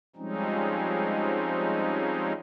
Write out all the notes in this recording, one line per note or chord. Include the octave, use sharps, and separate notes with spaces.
F3 G3 G#3 C4 C#4 D#4